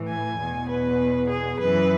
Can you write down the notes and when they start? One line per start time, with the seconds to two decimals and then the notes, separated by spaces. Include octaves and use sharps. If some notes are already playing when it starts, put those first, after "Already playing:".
Already playing: A2 E3
0.08 G#5
0.38 E2 B2
0.69 B4
1.30 G#4
1.60 F#2 E3 B4